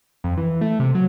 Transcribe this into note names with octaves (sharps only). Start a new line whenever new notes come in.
F2
E3
A3
C3
F#3